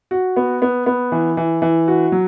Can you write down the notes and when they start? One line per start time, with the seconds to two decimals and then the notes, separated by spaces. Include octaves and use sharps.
0.11 F#4
0.36 B3
0.62 B3
0.86 B3
1.12 E3
1.37 E3
1.62 E3
1.88 F#4
2.12 F#3